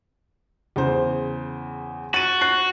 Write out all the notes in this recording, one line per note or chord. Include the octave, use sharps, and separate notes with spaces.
E2 C#3 C5
F#4 A6 D#7
F#6 C7